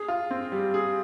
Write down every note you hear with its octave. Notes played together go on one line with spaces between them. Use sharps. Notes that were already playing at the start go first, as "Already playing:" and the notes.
Already playing: G#4
F4
C4
G3
G#4